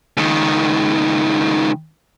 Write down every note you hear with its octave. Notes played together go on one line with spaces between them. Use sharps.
C#2 D#3